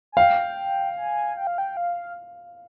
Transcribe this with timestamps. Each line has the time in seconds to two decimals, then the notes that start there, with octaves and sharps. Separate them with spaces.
0.12 G#5
0.17 F5 G5
0.97 G#5
1.37 G5
1.47 F5
1.58 G5
1.77 F5